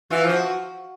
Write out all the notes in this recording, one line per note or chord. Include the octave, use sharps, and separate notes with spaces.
E3 F4
F3 F#4